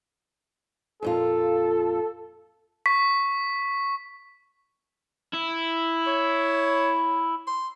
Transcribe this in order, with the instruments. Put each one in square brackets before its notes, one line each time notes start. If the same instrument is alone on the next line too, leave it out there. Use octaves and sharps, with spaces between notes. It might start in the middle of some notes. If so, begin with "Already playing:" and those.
[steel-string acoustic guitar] F2 A#2 F4 [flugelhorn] A4
[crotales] C#6 B6
[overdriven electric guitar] E4
[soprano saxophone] C#5
C6